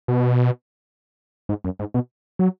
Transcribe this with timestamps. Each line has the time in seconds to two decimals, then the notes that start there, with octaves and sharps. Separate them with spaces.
0.08 B2
1.49 G#2
1.65 F#2
1.79 G#2
1.94 B2
2.39 F#3